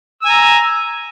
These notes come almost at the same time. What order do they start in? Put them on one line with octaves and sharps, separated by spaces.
E6 G#5 A#5